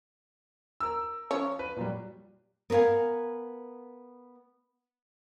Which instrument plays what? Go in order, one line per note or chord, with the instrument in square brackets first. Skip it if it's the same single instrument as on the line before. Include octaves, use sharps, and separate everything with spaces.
[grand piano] A#4 E6
[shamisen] F3 C#4 C#5
[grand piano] B4
A#2 F#3 G3
[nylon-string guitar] B3 A#4 C5 F5 G#5